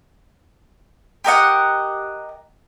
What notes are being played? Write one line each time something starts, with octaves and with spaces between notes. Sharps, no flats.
G4 A#4 D#5 F#5